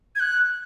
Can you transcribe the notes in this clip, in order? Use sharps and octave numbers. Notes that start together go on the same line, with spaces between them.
G#6
F#6